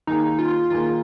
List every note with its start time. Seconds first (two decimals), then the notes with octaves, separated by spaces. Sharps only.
0.07 D#3 A#3 D#4 G#4
0.39 F4
0.70 D#3 A#3 F4 G#4